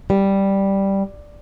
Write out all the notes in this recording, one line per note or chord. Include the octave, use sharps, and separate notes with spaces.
G3